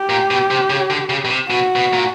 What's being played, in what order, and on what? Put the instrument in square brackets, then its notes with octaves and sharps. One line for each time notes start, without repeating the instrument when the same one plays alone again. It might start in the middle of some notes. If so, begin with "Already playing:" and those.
Already playing: [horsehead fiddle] G4
[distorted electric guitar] A#2
B2
C3
C#3
D3
C#3
B2
C3
[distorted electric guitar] B2 [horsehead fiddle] F#4
[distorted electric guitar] B2
A#2